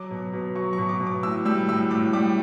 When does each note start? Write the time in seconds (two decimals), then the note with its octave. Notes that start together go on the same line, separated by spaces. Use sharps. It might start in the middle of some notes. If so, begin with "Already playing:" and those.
Already playing: F#3 D6
0.11 B2
0.33 B2
0.56 F#3 C#6
0.73 C#6
0.78 B2
0.89 D6
1.00 B2
1.07 D6
1.23 A2 E6
1.45 G3 E6
1.69 A2 E6
1.91 A2 D6
2.13 G3 D6